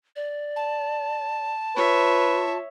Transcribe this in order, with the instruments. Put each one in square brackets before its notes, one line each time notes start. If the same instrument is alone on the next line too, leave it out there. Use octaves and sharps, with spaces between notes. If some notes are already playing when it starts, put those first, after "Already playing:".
[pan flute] D5
[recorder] A5
[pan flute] F4 [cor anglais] B4 [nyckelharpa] C#5 E5